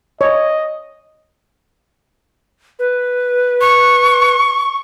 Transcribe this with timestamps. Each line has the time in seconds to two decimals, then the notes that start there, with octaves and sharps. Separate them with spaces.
0.21 C#5 D#5
2.79 B4
3.61 C#6